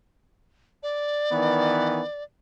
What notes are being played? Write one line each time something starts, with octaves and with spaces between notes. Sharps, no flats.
D5
D#3 E3 B3